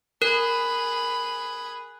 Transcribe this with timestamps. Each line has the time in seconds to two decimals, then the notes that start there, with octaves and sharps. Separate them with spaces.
0.22 G#4 A#4 B5 F#6